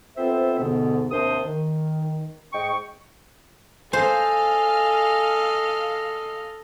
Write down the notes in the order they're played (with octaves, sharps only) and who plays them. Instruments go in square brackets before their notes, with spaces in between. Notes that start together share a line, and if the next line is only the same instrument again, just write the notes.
[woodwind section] B3 C4 F4 A4 C5 E5
D2 G#2 B2 D3 B3
D#2 C3 D4 A#4 C5 D#6
D#3
G#2 D#5 G5 C#6
[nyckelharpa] A4 D#5 [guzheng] C5 [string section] F5 F6 [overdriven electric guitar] G#5